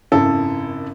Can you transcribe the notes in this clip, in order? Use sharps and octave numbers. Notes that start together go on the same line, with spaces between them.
G#1 F#2 C#3 E4 A4